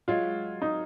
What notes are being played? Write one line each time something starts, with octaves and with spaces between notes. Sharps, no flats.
F#3 G#3 F4
D#4